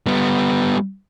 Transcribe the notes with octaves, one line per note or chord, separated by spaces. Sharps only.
G3 B3